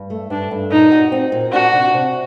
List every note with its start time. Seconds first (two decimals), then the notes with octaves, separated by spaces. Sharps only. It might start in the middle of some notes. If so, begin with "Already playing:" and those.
Already playing: G2
0.10 A3
0.30 G2 D4
0.51 G2
0.71 A#2 D#4
0.92 F#4
1.12 C4
1.32 A#2
1.52 D4 F#4
1.73 C3
1.94 C3